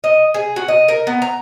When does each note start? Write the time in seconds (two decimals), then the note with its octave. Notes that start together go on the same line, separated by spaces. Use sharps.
0.04 D#5
0.34 G#4
0.56 F#4
0.68 D#5
0.88 A#4
1.07 B3
1.22 A#5